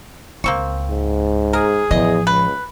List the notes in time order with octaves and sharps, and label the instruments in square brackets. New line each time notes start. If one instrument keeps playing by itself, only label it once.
[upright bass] C#2 [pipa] A#3 C4 C#6
[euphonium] G#2
[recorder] G#4 [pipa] A#4
[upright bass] A1 F3 [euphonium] E2 [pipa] D#5
[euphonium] C#2 [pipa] B4